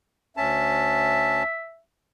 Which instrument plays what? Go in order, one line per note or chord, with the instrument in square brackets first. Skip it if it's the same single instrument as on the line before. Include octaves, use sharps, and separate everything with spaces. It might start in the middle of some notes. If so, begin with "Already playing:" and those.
[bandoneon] D2 C#4 A5 [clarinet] E5